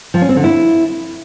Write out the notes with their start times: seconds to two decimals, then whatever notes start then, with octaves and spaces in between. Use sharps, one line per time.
0.14 F3
0.21 C#4
0.29 C4
0.36 D3
0.44 E4